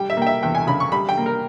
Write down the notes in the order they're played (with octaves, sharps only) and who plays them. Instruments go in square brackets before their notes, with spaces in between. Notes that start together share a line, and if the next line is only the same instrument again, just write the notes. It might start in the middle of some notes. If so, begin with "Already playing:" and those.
Already playing: [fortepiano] G3 G5
E5
A#3 G5
E5
E2 G5
G#5
C#3 B5
C#6
G3 B5
G5
A#3
A#4